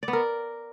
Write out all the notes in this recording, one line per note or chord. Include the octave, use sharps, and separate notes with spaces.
D5
B3
A#4